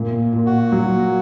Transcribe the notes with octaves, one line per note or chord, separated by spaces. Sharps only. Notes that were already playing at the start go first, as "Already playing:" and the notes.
Already playing: A#2
A#2
F#4
F#3